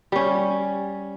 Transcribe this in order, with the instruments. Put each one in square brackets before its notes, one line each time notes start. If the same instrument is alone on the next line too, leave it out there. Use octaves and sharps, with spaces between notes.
[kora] G3 C#4